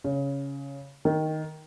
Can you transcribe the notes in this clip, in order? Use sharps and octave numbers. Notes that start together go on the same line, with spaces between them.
C#3
D#3